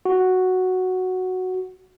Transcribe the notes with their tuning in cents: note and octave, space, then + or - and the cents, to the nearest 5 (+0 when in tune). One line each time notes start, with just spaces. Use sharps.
F#4 +0